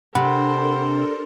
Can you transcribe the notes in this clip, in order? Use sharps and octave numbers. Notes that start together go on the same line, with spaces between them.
C3 D4 A4 A#4 C5 F#5 B5